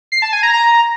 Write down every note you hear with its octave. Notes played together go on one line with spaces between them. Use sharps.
C7
A5
G#5
A#5
A#5